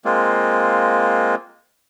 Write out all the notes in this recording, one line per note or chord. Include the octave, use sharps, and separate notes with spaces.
G#3 A#3 C4 F4